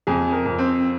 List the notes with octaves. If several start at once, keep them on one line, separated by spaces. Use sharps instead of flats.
F2 G#4
A#4
F2
C4 C5